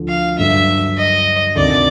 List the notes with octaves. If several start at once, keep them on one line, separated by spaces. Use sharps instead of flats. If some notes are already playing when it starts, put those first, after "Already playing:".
Already playing: D2 D3 F3 A3
F5
G2 D3 F#3 E5
D#5
D2 C3 D#3 D5